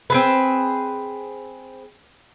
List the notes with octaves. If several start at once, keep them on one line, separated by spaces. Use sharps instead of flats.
C4 G#4 B4